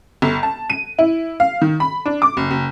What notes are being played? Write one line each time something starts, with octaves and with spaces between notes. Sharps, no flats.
G1
A5
D#7
E4
F5
D#3
B5
D4
D6
F#1
F#1